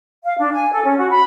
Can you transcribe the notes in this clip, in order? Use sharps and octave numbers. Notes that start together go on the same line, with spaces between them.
F5
D4
G#5
A4
C#4
F#4
B5